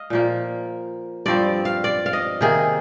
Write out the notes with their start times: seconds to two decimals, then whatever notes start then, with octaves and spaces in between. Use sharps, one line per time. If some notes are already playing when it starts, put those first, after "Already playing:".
Already playing: D#5 F5
0.10 A#2 F3 A#3
1.26 G2 F3 C4 D5
1.65 F5
1.84 D5
2.06 F5
2.13 D#5
2.41 C3 D#3 A#3 G#4